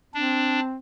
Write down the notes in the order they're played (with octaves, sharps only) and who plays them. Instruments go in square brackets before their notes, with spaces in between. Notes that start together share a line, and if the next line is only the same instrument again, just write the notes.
[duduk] C4 [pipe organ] D4